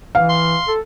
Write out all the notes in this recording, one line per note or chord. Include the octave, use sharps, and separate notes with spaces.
E3 F5
C6
A4